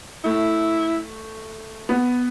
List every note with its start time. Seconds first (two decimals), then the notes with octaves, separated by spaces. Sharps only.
0.24 A3 E4
1.89 B3